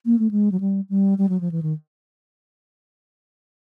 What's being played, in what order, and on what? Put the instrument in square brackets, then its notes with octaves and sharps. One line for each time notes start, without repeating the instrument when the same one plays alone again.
[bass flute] A#3
A3
G#3
F#3
G3
G3
G3
F#3
F3
E3
D#3